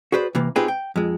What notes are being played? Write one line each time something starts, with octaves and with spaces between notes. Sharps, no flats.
F#4 G#4 B4 C5 D5
C3 E3 A#3
C4 D#4 F4 G4 G#4 B4
G5
F2 G#3